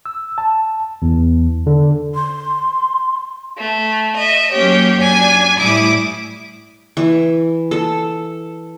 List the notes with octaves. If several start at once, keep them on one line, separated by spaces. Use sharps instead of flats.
E6
A5
E2
D3
C6
A3
D#5 E5
F#3 A#3 C#4 G4 C#5
F#2 D4 G#5
A2 G3 E4 D6 D#6
E3
A4